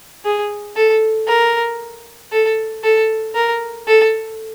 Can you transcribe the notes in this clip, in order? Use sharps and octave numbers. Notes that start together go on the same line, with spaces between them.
G#4
A4
A#4
A4
A4
A#4
A4